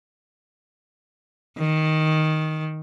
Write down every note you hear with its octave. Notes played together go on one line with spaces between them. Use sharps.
D#3